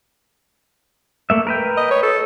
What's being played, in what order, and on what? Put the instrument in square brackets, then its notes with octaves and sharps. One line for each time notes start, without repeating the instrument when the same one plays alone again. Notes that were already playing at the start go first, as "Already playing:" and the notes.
[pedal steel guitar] A3 A#3 E5
A#4 B4 G5
[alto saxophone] D#5
C#5
A4